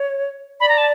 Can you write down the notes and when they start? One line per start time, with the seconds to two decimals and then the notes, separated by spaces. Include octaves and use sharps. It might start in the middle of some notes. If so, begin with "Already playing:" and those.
Already playing: C#5
0.60 D5 B5
0.69 A#5
0.78 A5